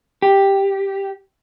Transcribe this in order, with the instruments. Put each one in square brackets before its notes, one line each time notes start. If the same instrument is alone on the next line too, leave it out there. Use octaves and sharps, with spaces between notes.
[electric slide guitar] G4